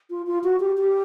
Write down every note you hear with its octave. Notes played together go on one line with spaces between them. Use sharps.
F4
F4
F#4
G4
G4